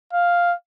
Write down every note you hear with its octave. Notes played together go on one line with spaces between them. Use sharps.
F5